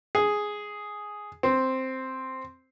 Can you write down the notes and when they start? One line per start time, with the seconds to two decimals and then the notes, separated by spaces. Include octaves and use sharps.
0.15 G#4
1.43 C4